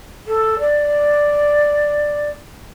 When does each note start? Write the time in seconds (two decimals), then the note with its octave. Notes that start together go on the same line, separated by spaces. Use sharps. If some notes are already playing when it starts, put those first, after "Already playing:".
0.27 A4
0.59 D5